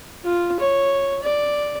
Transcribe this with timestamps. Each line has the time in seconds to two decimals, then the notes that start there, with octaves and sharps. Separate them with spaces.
0.24 F4
0.60 C#5
1.23 D5